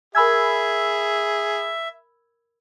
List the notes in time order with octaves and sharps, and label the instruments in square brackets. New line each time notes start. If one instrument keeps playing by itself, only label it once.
[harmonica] G#4 [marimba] A#4 G#5 [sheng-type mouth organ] E5 [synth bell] B5 E6 G#6